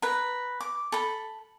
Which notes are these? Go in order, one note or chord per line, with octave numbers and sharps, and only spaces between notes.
B4 A#5
D6
A4 B5